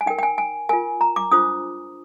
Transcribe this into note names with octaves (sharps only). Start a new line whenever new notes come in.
G#5
D#4 A#4 G5
G5
G#5
G#5
F4 A#4 G#5
A#5
D6
D4 F4 C5 D#6